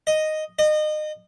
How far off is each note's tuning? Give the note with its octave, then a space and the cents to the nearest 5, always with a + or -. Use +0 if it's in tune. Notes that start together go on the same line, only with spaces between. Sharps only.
D#5 -5
D#5 -30